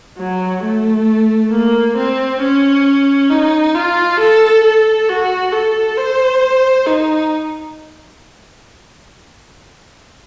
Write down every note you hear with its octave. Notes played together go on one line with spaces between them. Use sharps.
F#3
A3
A#3
C4
C#4
D#4
F4
A4
A4
F#4
A4
C5
D#4